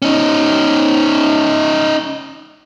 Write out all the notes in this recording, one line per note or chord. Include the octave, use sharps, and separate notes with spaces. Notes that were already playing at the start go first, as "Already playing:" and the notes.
C#4 D#4